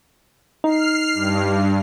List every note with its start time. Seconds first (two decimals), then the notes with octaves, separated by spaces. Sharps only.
0.64 D#4 F6 C7
1.14 G2